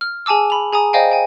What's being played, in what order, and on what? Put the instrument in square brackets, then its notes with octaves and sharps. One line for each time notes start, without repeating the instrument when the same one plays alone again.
[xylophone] F6
G#4 G#5 A5 D6 E6
B5 F7
G#4 G#5 A#5 D#6
C5 D5 D#5 F5 G5 G#5
G5 G#5